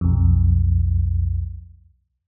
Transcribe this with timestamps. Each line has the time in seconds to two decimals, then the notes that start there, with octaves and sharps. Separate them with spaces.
0.01 B1 F2